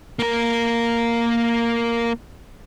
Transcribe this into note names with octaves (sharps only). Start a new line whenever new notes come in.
A#3 A#4